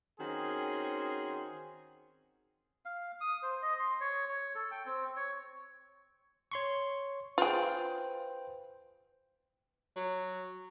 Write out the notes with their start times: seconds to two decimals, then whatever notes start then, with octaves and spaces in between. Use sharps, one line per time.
0.20 D#3 C4 C#4 F#4 G#4 C6
2.85 F5
3.21 D#6
3.43 C5
3.63 D#5
3.79 C6
4.01 C#5
4.29 C#5
4.55 A4
4.71 G5
4.86 C4
5.16 C#5
6.52 C#5 C6 C#6
7.38 F4 G#4 B4 C5 G5
9.96 F#3